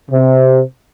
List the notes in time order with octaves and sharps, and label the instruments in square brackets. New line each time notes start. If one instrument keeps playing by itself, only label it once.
[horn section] C3